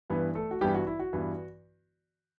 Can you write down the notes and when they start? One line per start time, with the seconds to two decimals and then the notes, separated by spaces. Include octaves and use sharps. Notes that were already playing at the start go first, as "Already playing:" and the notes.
0.10 G2 E3 B3
0.35 A3 A4
0.51 F#4
0.61 G2 E3 G3 B3 G4
0.74 F#4
0.87 E4
0.99 F#4
1.13 G2 E3 B3